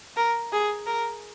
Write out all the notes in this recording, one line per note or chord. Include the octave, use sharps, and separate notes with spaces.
A#4
G#4
A#4